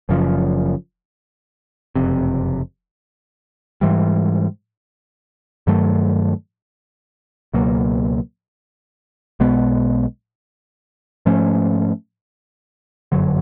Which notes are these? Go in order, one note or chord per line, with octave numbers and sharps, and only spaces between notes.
F#1 F#2 C#3 F3
F#1 F2 C3
G#2 E3 G3
G2 D#3 F#3 A3
C#2 B2 F#3 A#3
B1 B2 G#3 B3
G#2 F3 A3 C#4
G1 F#2 D3 F#3